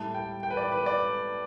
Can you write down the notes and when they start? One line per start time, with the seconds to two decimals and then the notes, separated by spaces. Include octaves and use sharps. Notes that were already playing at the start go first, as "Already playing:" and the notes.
Already playing: A2 G3 E4 A5
0.14 G5
0.43 G5
0.50 B4
0.57 D5
0.72 B4
0.86 D5